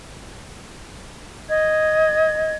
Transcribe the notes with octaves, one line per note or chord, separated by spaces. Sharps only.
D#5 G#6